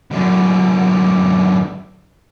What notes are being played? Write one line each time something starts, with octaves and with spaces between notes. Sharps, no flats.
F#2 D3